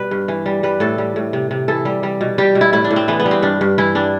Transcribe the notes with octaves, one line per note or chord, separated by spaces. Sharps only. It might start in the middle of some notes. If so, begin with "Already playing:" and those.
Already playing: B2 G3 B4
G2
E3
G3
G3 B4
A2 A4
G3
A2
C3
C3
E3 A4
G3
G3
B2
G3 G4
B2
E4
A2 E4
D4
A2
C4
E3 B3
B3
G3
C4
G2 D4
G2
E3 E4
G3 D4